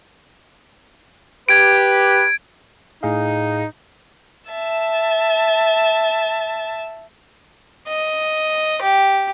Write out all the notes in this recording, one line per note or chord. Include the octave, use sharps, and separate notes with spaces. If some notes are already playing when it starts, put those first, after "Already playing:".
G4 B4 G#6 D7
A2 D#4 G#4 F5
E5 A5
D#5
G4